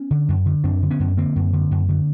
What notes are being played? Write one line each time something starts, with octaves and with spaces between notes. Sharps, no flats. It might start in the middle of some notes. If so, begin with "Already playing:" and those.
Already playing: B3 C#4
D3
F#2
D3
F#2 C4 D4
D3
B3 C#4
F#2
D3 A#3 C4
F#2
D3
F#2
D3